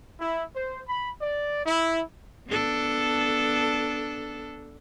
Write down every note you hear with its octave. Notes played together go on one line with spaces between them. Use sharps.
E4
C5
B5
D5
E4
B3 D4 A4